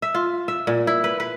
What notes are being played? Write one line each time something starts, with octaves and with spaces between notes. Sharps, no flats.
E5
F4
E5
A#2
E4
B4
B4